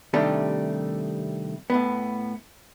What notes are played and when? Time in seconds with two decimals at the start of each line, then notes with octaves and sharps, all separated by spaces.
0.14 C3 D#3 G3 A3 D4 G4
1.70 A2 B3